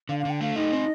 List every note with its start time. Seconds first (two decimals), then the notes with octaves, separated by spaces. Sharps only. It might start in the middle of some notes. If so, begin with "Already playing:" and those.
0.09 D3 F5
0.19 F5
0.25 D3 G5
0.41 A3 F5
0.56 D#4 D#5
0.73 C4